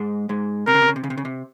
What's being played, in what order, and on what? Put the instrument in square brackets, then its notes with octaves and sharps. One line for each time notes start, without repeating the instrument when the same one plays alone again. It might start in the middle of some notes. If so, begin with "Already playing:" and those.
Already playing: [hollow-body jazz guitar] G#2 G#3
G#2 G#3
[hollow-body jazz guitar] C3 [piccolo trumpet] A#4
[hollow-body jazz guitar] C#3
C3
C#3
C3
C#3
C3
C#3
C3